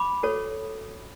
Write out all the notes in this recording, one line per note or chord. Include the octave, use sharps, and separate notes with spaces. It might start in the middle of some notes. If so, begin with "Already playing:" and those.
Already playing: B5 D6
F#4 A4 C#5